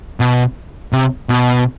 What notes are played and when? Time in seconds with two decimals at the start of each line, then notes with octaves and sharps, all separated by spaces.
0.20 B2
0.93 C3
1.29 B2